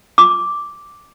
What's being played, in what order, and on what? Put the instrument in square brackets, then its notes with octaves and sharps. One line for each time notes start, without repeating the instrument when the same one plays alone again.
[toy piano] D6